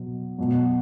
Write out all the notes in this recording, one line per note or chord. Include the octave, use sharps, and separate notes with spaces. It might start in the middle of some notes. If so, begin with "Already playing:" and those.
Already playing: B2 F#3
B2 F#3